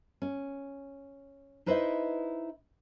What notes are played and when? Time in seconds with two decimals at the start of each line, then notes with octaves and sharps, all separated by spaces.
0.22 C#4
1.66 D#4 E4 B4 C5 D#5 E5